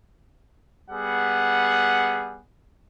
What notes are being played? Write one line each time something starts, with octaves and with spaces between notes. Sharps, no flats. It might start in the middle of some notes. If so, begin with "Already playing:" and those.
G3 B3 G#4 F#5